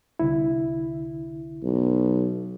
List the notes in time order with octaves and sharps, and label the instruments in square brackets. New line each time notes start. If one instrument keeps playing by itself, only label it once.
[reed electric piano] C2 D3 E4
[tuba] B1